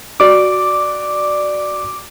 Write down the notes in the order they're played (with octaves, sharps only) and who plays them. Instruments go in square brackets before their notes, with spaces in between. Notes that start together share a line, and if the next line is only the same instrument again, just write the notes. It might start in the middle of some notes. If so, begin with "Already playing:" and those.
[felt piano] F#4 D5 [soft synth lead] D6